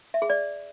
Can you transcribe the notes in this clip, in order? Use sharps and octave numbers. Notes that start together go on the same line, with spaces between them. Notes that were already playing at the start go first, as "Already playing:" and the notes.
E5
G#4
D5